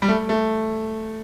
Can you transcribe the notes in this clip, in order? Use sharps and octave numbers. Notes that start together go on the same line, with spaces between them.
G3
A3
A3